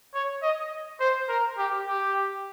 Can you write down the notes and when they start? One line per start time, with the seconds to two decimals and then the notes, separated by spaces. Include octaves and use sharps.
0.14 C#5
0.43 D#5
1.01 C5
1.29 A#4
1.58 G4
1.87 G4